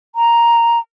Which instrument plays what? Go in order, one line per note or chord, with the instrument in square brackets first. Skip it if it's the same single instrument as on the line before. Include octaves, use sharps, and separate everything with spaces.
[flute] A#5